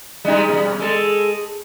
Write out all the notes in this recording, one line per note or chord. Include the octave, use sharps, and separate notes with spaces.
G3 G#3 D#4
B2 G3
G#3 A4